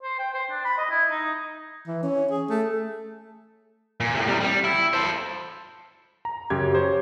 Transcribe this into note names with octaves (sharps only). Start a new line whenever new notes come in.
C5
G5
C5
D4
B5
D#5
E4
D#4
E3
C#4
G#4
A3
A#2
A2 C3
C3 G3
G3
E4
A4 C5
A#5
F#2 C#3 G4 G#6
G4 C5 C#5